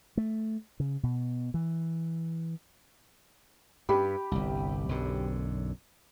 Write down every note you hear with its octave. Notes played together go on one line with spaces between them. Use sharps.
A3
C#3
B2
E3
G2 G4 B5
G1 C2
B1 F#2 D3